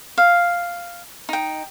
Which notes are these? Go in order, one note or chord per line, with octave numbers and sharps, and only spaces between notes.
F5
D#4 G5